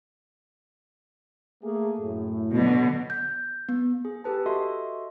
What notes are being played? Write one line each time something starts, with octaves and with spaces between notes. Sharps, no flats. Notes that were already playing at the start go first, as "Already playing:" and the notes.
A3 A#3 G#4
F#2 A2
B2 D3 F#3
G6
B3
G#4
G4 A4 B4 A5
F#4 A4 D#5 E5 C6